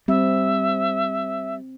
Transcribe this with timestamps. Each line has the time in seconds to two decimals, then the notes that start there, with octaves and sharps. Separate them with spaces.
0.08 G3 C4 E5